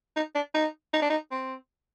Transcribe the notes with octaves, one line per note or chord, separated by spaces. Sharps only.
D#4
D4
D#4
D#4
D4
D#4
C4